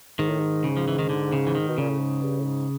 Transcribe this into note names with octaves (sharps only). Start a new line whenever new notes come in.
G#2 D#3
A2
G#2
C#3
F3
E3
D#3
D3
C#3
E3
D#3
B2
A#2 C#3
A2
G#2
G2
A2
G#2